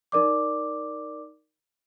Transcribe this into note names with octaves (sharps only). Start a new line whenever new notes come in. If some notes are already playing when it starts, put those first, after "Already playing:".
D#4 A#4 D5 D6